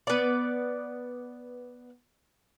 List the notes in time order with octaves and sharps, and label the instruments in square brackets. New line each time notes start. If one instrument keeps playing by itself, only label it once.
[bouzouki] B3 D5